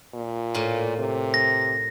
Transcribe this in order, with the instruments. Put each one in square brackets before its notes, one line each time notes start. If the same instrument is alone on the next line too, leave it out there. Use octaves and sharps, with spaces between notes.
[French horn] A#2
[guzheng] A2 A#3 F4
[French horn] C3
[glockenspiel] A#6